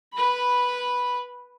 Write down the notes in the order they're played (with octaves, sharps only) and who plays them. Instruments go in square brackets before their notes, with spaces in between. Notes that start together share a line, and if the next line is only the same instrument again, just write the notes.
[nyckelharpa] B4 B5